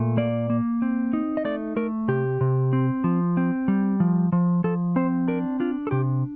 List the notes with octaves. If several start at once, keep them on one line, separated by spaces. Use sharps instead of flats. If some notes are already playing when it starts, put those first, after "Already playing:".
Already playing: A#2 A3
A#3 D5
A#3
C4
D#4
D#5
A3 D5
A3 A#4
C3 G4
C3
C4
F3
C4
G3
F3
F3
F3 A4
C4 C5
D4 A#4
D4 F4
A4
C3 G4